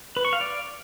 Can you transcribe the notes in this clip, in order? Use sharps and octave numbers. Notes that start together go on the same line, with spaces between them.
B4
C#6
F5
D5